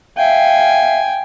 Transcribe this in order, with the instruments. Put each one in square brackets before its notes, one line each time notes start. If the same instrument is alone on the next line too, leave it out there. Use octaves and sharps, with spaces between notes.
[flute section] E5 F5 [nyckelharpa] G5 G#5